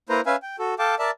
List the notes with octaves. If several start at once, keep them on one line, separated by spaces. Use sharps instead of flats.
A#3 E4 B4 C5 A#5
C#4 B4 E5 F5 G#5
G5
F#4 A4
A4 F5 G5 A5 D6
A#4 D5 E5 A5